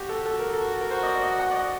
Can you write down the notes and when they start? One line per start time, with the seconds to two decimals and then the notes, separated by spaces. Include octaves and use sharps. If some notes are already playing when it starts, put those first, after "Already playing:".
Already playing: F#4 G4
0.09 A4
0.26 A4
0.39 A#4
0.54 F#4 A4
0.81 A#4
0.90 F#4 C5
1.03 D#5
1.07 D5
1.23 D#5
1.40 F#5
1.51 D5
1.56 D#5